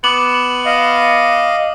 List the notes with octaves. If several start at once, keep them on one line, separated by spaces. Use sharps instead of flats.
B3 D6 F#7
D#5 F5